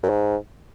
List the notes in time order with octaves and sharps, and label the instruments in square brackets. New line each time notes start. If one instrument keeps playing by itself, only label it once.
[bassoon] F#2
G#2